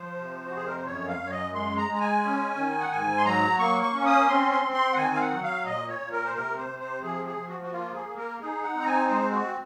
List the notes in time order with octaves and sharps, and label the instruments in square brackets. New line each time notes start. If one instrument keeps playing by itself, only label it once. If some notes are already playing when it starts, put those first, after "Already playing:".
Already playing: [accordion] F3 C5
C3
F#4
F2 G#4
A#4
C5
F#2 C#5
F5
F#2
C#5
D#5
G#3 C6
A#5
G#3
A#5
G#5
C#4
D#3
F#5
G#2 G#5
C6
F#3 A#5
A#3 C#6
C#6
C#4
D#6
C4 C6
C6
C4
C6
F#5
D#3 G#5
F5
F#5
F#3
F5
A#2 D#5
C#5
A#2
A#4
C5
C3 A#4
C5
C3
C5
F3 G#4
G#4
F3
F#4
F#4
A#3 F4
G#4
A#3
A#4
D#4 G#4
F#5
C4
A#5
G#5
G#3 C5
F#4